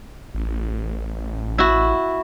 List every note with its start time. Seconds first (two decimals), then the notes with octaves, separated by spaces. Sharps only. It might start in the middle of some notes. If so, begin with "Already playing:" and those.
0.34 A1
1.58 E4 F#4